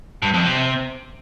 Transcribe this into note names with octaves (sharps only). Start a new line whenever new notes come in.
G2
F2
C3